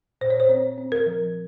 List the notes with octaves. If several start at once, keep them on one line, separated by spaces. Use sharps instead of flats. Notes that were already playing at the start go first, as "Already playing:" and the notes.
A#2 C5
C#5
C5
C4 C#5
C4
A#4
F3